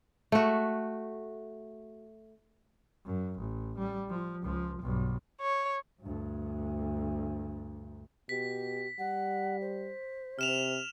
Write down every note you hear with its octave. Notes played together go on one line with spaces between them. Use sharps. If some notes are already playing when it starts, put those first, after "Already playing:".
A3 F#4
F#2
A1
G3
F3
C#2 F3
B1 G2
C#5
D2 G2
B2 G4 B6
G3 F#5
C5
C3 F6 E7 F7